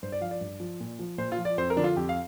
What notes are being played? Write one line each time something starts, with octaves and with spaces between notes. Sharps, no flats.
G2 C5
D5
F3 F5
D5
G2
F3
A#2
F3
A#2 C5
F4
F3
D5
F2 C5
A#4
D3 F3 D4
F4
F2 G4
F5